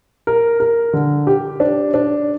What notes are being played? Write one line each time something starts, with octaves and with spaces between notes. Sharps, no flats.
A#4
A#4
D3
G4
D4
D4